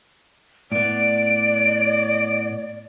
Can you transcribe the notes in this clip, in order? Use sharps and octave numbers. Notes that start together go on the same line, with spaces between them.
A2 B3 D5 D7